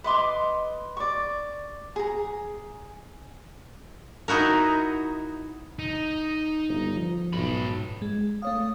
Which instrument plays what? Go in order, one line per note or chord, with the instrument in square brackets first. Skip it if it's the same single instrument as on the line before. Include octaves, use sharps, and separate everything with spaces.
[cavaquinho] B4 D#5 C6 D6
D5 C#6
G#4 A#5
[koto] D#4 E4 F#4 A#4
[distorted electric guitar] D#4
[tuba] G1
F3
[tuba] B1 [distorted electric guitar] G#2 B5
[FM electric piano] G#3
[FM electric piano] A3 C#5 F5 [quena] D#6